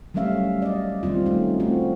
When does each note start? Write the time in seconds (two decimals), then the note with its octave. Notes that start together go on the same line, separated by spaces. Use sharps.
0.14 F#3 G3 A3 C#4 E5 F5
0.62 D5 D#5
1.03 D#3 G3 C4 F4
1.26 A3 C#4 D#4
1.60 A3 C4 F4 F#4